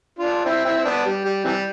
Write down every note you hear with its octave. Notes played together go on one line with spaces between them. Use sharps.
D4 F4
C4 E4
C4 E4
C4
B3 D4
G3
G3
C3 E3 G3